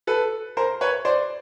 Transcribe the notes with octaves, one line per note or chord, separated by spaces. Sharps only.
A4 B4
A#4 C5
B4 C#5
C5 D5